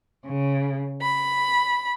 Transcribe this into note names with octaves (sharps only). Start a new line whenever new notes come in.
C#3
B5